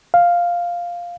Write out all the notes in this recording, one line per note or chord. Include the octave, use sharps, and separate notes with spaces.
F5